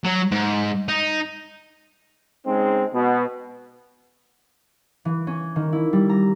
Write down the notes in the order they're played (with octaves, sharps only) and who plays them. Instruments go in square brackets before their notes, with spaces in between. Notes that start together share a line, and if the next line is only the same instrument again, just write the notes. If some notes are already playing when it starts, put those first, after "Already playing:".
[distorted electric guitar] F#3
G#2
D#4
[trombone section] C#3 G#3 C4 D#4
B2
[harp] E3
C#4
D#3
E4
G3
A#5